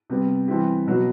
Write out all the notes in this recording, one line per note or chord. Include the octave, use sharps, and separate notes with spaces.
C3 G3 B3
E3 G3 C4 E4 G4
B2 F#3 B3 F#4